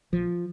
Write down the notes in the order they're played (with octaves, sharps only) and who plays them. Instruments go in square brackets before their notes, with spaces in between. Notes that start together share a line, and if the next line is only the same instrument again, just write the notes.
[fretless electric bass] A#1 F3